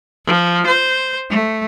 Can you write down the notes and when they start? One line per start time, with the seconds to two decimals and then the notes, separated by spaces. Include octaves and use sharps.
0.24 F3
0.64 C5
1.28 A3